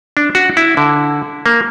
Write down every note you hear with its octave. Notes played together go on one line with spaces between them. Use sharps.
D4
F#4
E4
D3
A#3